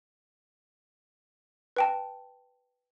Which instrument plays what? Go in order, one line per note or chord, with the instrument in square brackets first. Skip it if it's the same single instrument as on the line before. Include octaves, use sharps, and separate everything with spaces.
[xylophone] B4 G5 A5